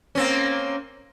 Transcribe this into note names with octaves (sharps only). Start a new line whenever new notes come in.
A#3 C4 C#4